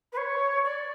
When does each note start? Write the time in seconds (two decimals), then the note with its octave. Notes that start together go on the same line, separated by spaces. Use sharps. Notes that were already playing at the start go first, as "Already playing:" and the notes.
0.13 B4
0.17 C#5
0.64 D5